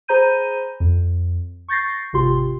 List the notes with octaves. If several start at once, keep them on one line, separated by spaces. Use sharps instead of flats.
G#4 C5 A#5 B5 G6 D#7
F2
C#6 G6 A6 A#6 C7
G#1 C3 F4 G4 C6